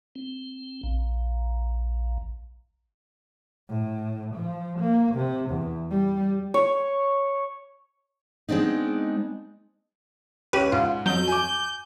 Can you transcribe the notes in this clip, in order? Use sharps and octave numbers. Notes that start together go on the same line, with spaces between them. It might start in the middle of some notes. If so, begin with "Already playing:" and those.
C4
A#1
A2
F3
A#3
C3
E2
G3
C#5
G#3 B3 C4 D4 D#4
C#2 C#4 G4 B4 D#7
G#2 F4
F2 F#3 G6
G#5 D6